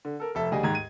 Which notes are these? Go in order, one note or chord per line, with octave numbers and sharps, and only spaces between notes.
D3
A4 A#4
F1 A4 E5
D2 G3 G#4 D#5
D#2 G#2 G#6
D#7